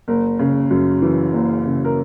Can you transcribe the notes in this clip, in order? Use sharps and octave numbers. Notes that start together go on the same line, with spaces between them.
F#1 A#4
C#3
F#2
E3
F#1
C#3
A#4